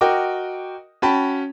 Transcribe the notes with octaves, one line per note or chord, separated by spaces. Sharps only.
F#4 A#4 D#5 G5 D6
C#4 F#4 G5 A5 B5